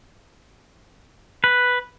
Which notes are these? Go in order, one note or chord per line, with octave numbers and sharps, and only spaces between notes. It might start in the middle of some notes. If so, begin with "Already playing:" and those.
B4